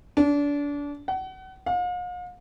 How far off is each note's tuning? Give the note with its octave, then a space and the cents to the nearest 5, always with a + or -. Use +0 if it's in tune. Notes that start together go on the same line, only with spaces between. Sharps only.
D4 -30
F#5 +35
F5 +45